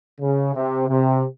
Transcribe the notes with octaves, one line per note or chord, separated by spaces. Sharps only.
C#3
C3
C3